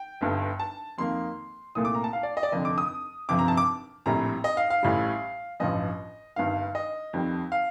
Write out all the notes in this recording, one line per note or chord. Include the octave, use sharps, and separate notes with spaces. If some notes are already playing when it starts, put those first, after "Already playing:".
Already playing: G5
G1 G2 D3
A5
F2 D#3 A#3 C6
C2 A#2 A3 D#6
D6
A#5
A5
F5
D5
D#5
D5
F1 F2 D3 D#5
D6
D#6
G1 F2 C3 F3 D6
A#5
A5
D6
A#1 A2 G3 C4 A#5
D#5
F5
F5
A1 A2 G3
A1 G2 F3 D#5
G1 G2 D#3 F5
D#5
F2 D#3 G3 C4
F5